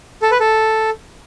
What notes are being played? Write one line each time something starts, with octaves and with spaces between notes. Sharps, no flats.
A4
B4
A4